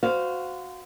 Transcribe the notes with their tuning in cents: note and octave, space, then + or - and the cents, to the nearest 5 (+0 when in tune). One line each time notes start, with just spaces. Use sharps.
F#4 -10 C5 -25 F5 +0